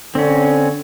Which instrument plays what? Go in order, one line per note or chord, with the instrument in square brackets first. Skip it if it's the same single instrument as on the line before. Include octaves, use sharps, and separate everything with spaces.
[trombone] D3 [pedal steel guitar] C4 C#4